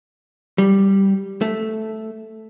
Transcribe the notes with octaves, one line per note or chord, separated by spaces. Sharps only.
G3
A3